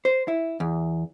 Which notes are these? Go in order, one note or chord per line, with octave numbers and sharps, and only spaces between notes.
C5
E4
E2